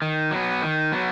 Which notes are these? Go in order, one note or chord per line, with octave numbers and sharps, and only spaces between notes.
D#3
F#3 B3
D#3
F#3 B3